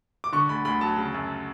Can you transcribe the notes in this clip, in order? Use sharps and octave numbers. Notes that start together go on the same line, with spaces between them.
D6
D3 C#6
D2 B5
D2 B5
F#3 A5
C#3
F#2